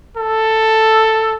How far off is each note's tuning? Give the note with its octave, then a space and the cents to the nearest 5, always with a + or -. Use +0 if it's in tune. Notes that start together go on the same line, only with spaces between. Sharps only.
A4 +5